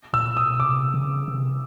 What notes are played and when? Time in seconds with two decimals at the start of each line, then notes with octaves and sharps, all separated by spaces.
0.13 A#2 E6
0.37 B2 D#6
0.59 C3 D6
0.94 C#3
1.28 C3